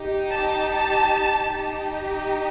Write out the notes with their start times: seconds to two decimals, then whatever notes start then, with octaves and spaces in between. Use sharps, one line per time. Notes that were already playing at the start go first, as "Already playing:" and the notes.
Already playing: D#4 G4
0.29 A5
1.52 D#4 G4